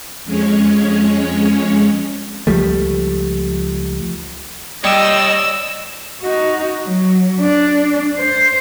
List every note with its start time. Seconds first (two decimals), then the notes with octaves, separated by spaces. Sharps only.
0.25 F2 G#3 C#4 C#5
2.47 C#2 F3 G3 A3
4.84 G3 C#5 D#5 G5 E6
6.22 D#4 F#4
6.82 F#3
7.40 D4
8.18 C5